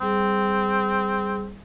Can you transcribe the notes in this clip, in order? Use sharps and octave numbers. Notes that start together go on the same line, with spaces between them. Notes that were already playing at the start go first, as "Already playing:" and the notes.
G3 C4 G#4